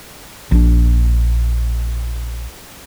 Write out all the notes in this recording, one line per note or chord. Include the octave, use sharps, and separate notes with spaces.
A#1 D4